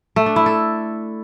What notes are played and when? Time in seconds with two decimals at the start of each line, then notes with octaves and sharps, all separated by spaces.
0.16 A3
0.26 D4
0.36 E4
0.46 A4